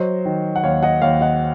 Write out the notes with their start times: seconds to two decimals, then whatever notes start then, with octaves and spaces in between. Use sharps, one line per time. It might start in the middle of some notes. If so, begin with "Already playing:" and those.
Already playing: F#3 C5 D#5
0.25 D#3
0.56 F#5
0.64 D#2 C#5 F5
0.83 D#5 F#5
1.02 D#2 C#5 F5
1.21 D#5 F#5